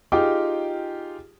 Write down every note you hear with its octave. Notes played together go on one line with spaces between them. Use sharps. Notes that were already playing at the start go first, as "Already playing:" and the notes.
D#4 F4 G4 G#4 G5 D6